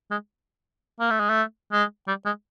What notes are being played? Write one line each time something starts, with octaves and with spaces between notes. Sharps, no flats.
G#3
A#3
A3
G#3
A3
G#3
G3
G#3